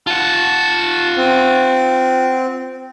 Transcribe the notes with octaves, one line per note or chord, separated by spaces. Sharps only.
F4 F#5 A5
C4